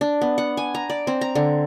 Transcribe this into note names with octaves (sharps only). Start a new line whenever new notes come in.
D4
B3
F#5
G#5
A#5
D5
C4
A#5
D3